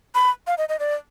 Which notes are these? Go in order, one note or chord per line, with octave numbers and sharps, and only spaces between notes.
B5
F5
D#5
D#5
D5